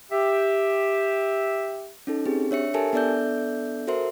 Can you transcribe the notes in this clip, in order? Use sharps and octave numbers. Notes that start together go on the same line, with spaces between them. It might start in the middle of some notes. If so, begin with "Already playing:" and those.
G4 E5
C#4 D#4 A4
C4 G4 G#4
D4 C#5 E5 C#7
G4 A4 A#4 E5 G#5 A5
B3 D4 A4 D5 E5 G6
F#4 A4 A#4 C5 E5 C6